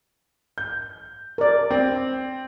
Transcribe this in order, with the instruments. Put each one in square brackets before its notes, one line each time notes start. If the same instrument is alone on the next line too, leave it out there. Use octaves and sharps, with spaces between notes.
[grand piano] G6
[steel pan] A#4 D5
[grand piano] C4